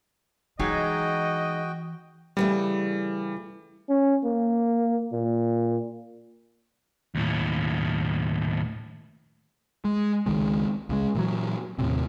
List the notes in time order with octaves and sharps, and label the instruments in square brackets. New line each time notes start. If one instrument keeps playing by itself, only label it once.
[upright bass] E3 [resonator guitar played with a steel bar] F#3 G#3 D#4 [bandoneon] F#4 G5 [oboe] D#5
[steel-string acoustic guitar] C#3 E3 A3 [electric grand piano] G3
[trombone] C#4
A#3
A#2
[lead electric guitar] D#2 A2
[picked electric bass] G#3
C#2 D#3 G#3
C#2 C#3 G#3
A#2 E3 F#3
D#2 A2 C3